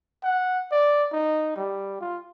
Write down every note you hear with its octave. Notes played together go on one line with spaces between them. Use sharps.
F#5
D5
D#4
G3
F4